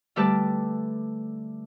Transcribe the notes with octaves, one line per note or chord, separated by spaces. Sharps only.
D3 G3 A3 G4 B4 A5